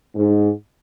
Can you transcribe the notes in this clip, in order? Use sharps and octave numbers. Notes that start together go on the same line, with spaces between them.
G#2